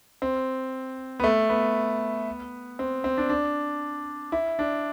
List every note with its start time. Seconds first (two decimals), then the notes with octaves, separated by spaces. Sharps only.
0.22 C4
1.20 B3
1.24 A3
1.49 B3
2.79 C4
3.04 C4
3.18 D4
3.29 D4
4.32 E4
4.59 D4